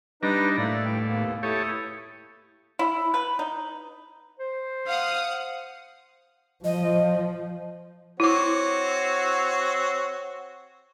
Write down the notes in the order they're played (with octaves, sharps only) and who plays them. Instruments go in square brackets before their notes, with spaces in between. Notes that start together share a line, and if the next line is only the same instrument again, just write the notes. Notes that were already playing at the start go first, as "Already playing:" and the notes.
[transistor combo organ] G3 D4 A#5 [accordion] D#4 B4 D#5
[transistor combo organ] A2 [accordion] A#3 E4 D5
[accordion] D#2 G5
D#2 A#3 B3
[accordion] A3 E4 D#6 [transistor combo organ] G4 A4 C#5
[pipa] E4
B4
D#4
[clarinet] C5
[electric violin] F5 [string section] F#5 D#6
[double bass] F3 [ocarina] D#5
[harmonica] C4 F#4 C#5 [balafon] E4 D6